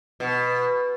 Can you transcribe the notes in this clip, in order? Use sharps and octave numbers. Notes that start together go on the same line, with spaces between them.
B2